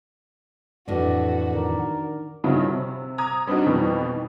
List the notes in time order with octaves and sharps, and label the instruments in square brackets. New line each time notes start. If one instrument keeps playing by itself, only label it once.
[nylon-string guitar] F2 A2 E3 [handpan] D4 D5 [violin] F#4
[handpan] D#3 D5 [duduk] A#4
[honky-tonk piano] G2 C#3 F3 D#4 E4 F#4
C3
A#5 D6 D#6 G#6
G3 C4 D4 D#4 F#4
F2 B2 D#3 E3 G3